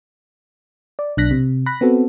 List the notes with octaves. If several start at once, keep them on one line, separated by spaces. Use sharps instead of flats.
D5
B1 D4 F#6 A#6 B6
C3
B5 F#6 A#6
B3 C4 F#4 A4